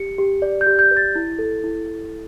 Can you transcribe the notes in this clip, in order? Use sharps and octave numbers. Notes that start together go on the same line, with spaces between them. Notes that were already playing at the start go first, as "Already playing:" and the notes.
Already playing: G4 C#7
G4
D5
G6
G4
G6
B4
A6
E4
A4
E4